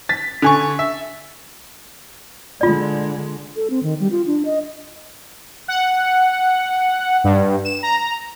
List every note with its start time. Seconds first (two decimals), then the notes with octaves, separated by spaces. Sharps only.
0.09 A6 B6
0.42 D3 G#5 C#6
0.79 E5
2.61 D3 G#3 F4 D5
3.56 A4
3.70 C4
3.83 D#3
4.00 G3
4.11 F4
4.27 D4
4.45 D#5
5.68 F#5
7.24 G2
7.65 E7
7.83 A#5